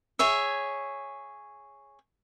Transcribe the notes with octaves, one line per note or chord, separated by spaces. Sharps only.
G#4 C#5 E5